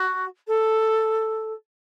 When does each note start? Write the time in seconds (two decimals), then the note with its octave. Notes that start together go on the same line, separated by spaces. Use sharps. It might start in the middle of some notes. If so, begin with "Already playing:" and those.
Already playing: F#4
0.48 A4